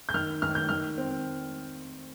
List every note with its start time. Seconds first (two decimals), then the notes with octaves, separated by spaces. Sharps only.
0.09 G6
0.14 D#3 F6
0.42 D#3 F6
0.55 G6
0.69 D#3 F6
0.98 C4